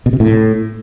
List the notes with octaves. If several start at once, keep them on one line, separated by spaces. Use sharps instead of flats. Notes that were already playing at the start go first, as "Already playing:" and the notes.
B2
C3
A2